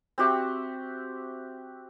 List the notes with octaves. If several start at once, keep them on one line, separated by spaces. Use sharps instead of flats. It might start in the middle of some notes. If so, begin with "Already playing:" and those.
C4 F#4 G4 E5